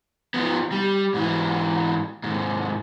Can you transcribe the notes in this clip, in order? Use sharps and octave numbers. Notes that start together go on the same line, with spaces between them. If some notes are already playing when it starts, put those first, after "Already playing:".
F3 B3
G3
G#2 E3
D#2 G#2